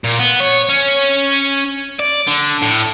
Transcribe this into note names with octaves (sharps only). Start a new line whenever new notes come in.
A#2
B3
C#5
C#4
D5
D3
A2